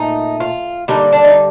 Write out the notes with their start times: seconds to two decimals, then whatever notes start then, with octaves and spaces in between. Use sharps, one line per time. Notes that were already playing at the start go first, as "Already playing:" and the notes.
Already playing: A#2 A3 D#4
0.40 F4
0.88 D3 G3 A#3 D#4
1.12 D4
1.24 D#4